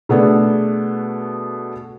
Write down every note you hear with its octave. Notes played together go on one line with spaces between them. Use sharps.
B2 A3 B3 D4 G#4